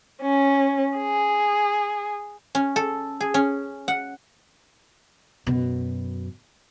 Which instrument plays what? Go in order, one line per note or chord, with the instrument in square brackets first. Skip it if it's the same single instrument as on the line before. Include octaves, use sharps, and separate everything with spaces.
[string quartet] C#4
G#4
[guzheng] C#4
A4
G#4
C#4
F#5
[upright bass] F#2 B2